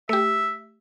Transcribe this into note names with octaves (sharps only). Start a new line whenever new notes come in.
A3 G4 E5